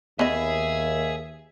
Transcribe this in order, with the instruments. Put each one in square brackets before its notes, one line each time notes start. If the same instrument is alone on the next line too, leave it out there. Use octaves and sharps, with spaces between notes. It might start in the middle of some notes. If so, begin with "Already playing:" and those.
[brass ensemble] D#2 [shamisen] B3 D#5 [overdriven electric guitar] G#4 [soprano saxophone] E5